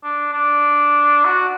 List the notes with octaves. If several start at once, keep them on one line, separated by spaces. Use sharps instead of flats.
D4
D4
F#4